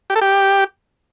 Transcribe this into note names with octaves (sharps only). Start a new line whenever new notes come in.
G4
A4
G4